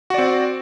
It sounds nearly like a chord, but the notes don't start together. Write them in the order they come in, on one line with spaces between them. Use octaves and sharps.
F#4 D5 C4